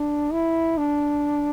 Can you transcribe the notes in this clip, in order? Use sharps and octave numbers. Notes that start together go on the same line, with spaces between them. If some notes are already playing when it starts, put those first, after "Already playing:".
Already playing: D4
E4
D4